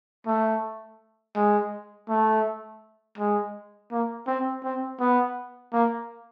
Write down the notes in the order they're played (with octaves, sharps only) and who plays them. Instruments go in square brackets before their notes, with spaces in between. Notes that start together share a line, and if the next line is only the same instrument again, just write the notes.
[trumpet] A3
G#3
A3
G#3
A#3
C4
C4
B3
A#3